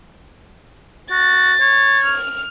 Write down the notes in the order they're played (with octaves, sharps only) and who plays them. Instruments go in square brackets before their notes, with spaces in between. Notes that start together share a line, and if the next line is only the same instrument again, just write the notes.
[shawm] F#4 [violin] A6
[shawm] C#5
[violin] F6